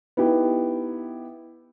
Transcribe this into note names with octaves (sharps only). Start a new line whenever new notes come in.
B3 D#4 E4 G4